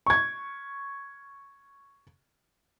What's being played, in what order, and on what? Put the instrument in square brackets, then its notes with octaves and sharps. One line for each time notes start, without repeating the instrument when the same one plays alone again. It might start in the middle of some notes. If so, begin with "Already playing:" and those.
[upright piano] C#6 G#6